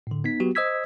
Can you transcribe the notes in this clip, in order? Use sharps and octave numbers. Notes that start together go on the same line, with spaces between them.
A2 D3
B3 D#4 B6
F#3 B3 F#4 G4
C5 D#5 D#6 E6 G#6 B6